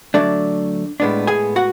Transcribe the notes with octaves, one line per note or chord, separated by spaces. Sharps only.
D3 F#3 A3 D4 D5
A2 G#3 B3 D4
G#4 G#5
F#4 F#5